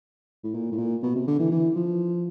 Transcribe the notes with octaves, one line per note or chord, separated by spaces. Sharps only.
A2
A#2
A2
A#2
B2
C3
D3
E3
E3
F3